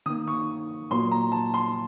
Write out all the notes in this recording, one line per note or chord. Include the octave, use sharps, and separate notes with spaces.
D#3 A#3 D#6
C#6
A#2 F#3 A#3 C6
A#5
A5
C6